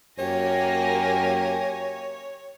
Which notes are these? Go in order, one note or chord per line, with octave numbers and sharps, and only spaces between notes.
F#2 A#3 G4 C#5 G#5 A#6